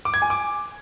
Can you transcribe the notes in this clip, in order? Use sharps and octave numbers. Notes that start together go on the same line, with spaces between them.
D6
G#6
G#5
D6